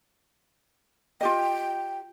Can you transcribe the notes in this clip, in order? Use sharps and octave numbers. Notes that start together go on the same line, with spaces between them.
F4 G4 D#5 G5